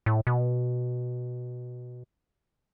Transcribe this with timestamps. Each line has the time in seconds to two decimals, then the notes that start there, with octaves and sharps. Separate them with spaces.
0.06 A2
0.27 B2